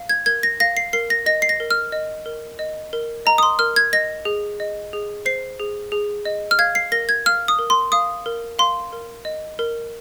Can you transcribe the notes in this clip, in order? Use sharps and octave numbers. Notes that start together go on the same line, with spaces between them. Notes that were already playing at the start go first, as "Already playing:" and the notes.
Already playing: F5
G#6
A#4 G#6
A#6
F5 A#6
C7
A#4 C7
A#6
D#5 A#6
C7
A#6
A#4
F6
D#5
A#4
D#5
A#4
D#5 A#5
D#6
C6
A#4 F6
G#6
D#5 A#6
G#4
D#5
G#4
C5 C7
G#4
G#4
D#5
F6
F5 G#6
C7
A#4 A#6
G#6
F5 F6
D#6
A#4
C6
F5 D#6
A#4
F5 C6
A#4
D#5
A#4